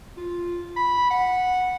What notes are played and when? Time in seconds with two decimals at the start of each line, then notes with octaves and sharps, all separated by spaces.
0.17 F4
0.76 B5
1.10 F#5